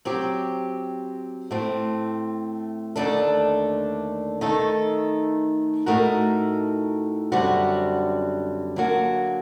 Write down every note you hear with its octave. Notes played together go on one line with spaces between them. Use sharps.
F#3 C4 G4
A2 A3 C4
D#2 D3 A3 D4 A4
D#3 A3 D#4 A4
A2 A3 D#4 F#4 A#4
F#2 D3 G3 C4 F#4
D3 F#3 A#3 F#4